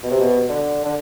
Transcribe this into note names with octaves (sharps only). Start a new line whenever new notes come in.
B2
C3
B2
D3
D3